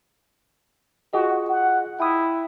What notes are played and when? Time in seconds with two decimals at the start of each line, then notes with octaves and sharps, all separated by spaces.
1.13 F4 F#4 G#4 D#5
1.49 F#5
2.00 E4 G5 D#6